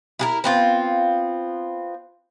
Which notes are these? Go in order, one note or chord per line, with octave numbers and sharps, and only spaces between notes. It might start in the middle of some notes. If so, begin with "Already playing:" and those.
E4 G#4 A#4
B3 C4 F4